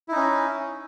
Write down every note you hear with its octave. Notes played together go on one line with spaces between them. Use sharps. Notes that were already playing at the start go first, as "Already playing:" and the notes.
C#4 D#4 E4